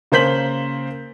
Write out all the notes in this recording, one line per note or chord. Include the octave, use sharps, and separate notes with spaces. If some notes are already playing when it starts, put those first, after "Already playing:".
C#3 A#3 C5 G6 B6 F#7